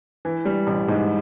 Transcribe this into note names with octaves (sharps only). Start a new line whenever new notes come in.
E3
G3
A1
G#2